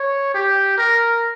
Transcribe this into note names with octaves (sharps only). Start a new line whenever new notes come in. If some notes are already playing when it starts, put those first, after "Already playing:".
Already playing: C#5
G4
A#4